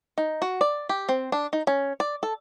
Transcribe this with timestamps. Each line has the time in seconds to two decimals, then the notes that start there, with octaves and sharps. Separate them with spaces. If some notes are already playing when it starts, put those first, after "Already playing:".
0.18 D#4
0.42 F#4
0.61 D5
0.89 G4
1.09 C4
1.32 D4
1.53 D#4
1.67 C#4
2.00 D5
2.23 A4